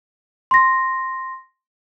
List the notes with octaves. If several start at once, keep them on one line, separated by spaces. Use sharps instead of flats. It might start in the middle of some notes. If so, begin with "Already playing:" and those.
C6 A#6